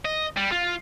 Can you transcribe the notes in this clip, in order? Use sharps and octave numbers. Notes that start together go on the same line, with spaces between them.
D#5
G3
F4